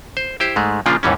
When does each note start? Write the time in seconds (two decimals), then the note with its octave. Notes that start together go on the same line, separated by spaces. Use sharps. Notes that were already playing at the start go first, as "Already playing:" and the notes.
0.17 C5
0.40 E4 G4 C5
0.56 G#2 G#3 A3
0.86 A#2 C#3 F3 A#3 D4 F4
1.03 D#2 G#2 E3 G3 C#4